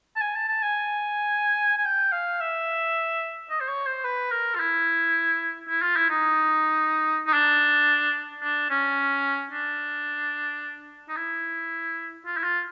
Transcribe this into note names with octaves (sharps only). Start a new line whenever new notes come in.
A5
G#5
A5
A5
G#5
G#5
G5
F5
E5
D#5
C5
C#5
C5
B4
A#4
F4
E4
E4
F4
E4
D#4
D#4
D4
D4
C#4
D4
D#4
E4
F4
E4
F4